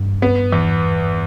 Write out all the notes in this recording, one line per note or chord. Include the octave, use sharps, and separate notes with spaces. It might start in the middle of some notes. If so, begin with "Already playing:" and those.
Already playing: G2
B3
E2